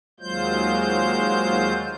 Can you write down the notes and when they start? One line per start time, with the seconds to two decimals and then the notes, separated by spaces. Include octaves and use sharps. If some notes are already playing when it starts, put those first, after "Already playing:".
0.20 D#2 F#3 G#3 F4 C5 G6